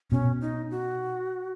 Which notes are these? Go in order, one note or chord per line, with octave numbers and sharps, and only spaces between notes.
B2 C#4
D#4
F#4